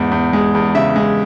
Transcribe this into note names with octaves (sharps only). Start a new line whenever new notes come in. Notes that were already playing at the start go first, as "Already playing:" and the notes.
Already playing: E2 G#2
E2
G#3
E2
C#3 E5
G#3